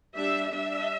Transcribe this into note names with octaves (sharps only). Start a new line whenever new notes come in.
G3 D4 E5
G3 D4 E5